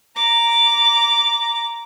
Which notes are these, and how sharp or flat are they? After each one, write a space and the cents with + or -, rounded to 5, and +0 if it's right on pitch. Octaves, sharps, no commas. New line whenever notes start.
A#5 +0 D6 -10